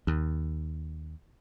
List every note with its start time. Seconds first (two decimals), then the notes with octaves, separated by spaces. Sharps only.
0.07 D#2